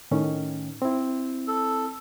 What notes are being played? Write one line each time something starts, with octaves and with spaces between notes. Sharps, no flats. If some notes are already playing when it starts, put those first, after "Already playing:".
A2 D#3 C#4
C4 E4
A4